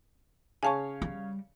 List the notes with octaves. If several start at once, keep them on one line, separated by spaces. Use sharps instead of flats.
C#3 C#5 F5 G#5 A5 C#6
G3